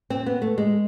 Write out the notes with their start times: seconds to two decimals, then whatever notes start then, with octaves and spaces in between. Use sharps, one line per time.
0.10 C4
0.26 B3
0.42 A3
0.58 G#3